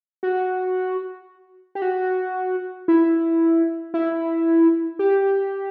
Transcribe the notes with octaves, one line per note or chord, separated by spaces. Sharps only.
F#4
G4
F#4
E4
E4
G4